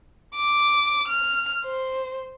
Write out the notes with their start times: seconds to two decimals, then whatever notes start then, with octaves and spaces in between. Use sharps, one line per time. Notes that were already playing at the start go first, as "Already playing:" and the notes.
0.36 D6
1.08 F6
1.65 C5